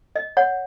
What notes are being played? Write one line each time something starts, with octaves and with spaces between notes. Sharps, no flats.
D#5
C#5 F#5